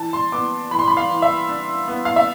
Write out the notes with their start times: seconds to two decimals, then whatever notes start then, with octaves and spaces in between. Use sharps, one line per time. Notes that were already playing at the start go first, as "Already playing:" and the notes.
Already playing: E3 A5
0.13 C6
0.32 B3 D6
0.71 E3 B5
0.79 C6
0.88 B5
0.97 F5
1.10 E3
1.22 E5
1.49 D4
1.88 B3
2.05 F5
2.16 E5